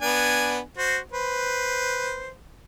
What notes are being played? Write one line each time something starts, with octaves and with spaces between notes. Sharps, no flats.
B3 D4 G#5
F#4 C5
B4 C5